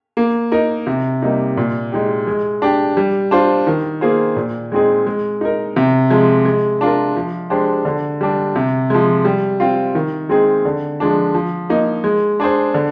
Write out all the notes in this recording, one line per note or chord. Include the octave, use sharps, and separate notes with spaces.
A#3
D#4 A#4
C3
G3 A#3 D#4
A#2
G#3 D#4 G4
G#3
D4 G4
G3
D4 F4 C5
D#3
A#3 F4 G#4 C5
A#2
G#3 C4 D#4 G#4
G#3
D#4 A#4
C3
F3 G#3
G#3
D4 F4 A#4
F3
G#3 D4 G4 C5
D3
G3 D4
C3
F3 G#3
G3
C4 F4
D#3
G#3 C4 D#4 G#4
D3
F3 G#3 D4
F3
A#3 D#4
G#3
D4 G#4 C5
D3